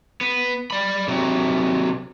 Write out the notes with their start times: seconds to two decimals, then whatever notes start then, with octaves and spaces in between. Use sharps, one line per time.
0.21 B3
0.71 D5 B5
1.08 C3 F#3